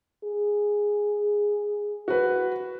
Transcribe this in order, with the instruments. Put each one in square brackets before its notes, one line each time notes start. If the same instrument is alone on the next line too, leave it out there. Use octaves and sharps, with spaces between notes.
[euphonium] G#4
[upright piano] F#4 B4